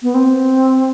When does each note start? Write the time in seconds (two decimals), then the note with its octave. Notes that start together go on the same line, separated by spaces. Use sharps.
0.03 B3
0.14 C4